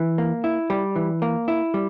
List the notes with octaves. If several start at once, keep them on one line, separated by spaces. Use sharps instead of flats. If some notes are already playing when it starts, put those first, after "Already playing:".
Already playing: E3
A#3
E4
G3
E3
A#3
E4
G3